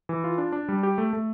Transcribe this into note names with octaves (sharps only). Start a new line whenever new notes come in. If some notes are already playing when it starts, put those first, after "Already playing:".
E3
F4
D4
D4
G3
G4
A3
A3